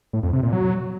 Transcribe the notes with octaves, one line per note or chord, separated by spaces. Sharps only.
A2
F2
C3
A#2
F#3